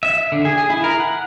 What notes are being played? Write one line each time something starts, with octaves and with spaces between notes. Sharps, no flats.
E5
D3
G#4
G#4
E4
A#4
F#5